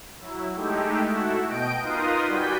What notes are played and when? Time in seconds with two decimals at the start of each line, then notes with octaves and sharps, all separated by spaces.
0.20 F#3 E4
0.55 G#3 A3 D#4 E4 G4
1.06 A3 E4 F#4
1.47 B2 D#5 G5 D7
1.81 D#4 F4 A#4 B4 C6 D#6
2.26 G3 F#4 D5 G#5 G6 B6